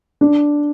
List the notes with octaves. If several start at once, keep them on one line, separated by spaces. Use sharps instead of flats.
D4